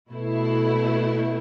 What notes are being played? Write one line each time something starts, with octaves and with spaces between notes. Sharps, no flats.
B2 A3 E4